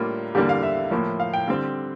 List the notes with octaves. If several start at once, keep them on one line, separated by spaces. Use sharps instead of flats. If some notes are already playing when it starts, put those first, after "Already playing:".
Already playing: A2 G3 A#3 D4 F4
E2 D3 G3 A#3 G4
F5
E5
A2 F3 A#3
F5
G5
D3 G3 C4